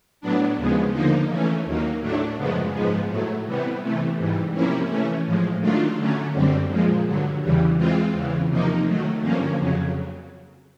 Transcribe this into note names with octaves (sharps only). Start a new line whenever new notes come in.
A2 F#3 B3 D4
D#2 C#3 F3 G#3 B3
D3 F3 A#3 D#4
E3 A3 C#4
D#2 D#3 F#3 A#3
A2 F#3 A3 D4
F#2 C#3 F3 G#3 B3
G#2 F3 G#3 B3
A2 F#3 A3
C3 E3 G3 B3
C3 E3 A3
G#2 E3 G3
C3 F3 A#3 C#4 E4
E3 A3 C#4
A2 F3 G#3
D#3 F#3 A3 D4 F4
D3 F#3 A3 C#4
F#2 D3 G3 C4
A#2 F3 G#3
G2 D3 F#3
E2 C#3 E3 G3
E3 G#3 C4 F4
E2 C#3 E3
C3 F3 A#3 D#4
D#3 F#3 A3
G2 D3 F3 A#3 C#4
F2 C#3 F#3